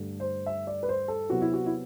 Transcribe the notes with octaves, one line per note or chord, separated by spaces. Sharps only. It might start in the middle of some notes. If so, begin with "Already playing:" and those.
Already playing: G2 D3 A3
C5
E5
D5
B4
C5
A4
C3 F#3 B3 E4 F#4
E4
F#4
E4